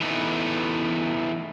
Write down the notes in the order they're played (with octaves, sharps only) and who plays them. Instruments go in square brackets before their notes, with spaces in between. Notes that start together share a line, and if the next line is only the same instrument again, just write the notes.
[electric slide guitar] E3 A3 B3 D#4 B4